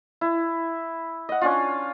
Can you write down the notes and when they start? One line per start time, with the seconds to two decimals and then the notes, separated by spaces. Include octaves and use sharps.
0.21 E4
1.29 D#5 F#5
1.41 C#4 D4 F4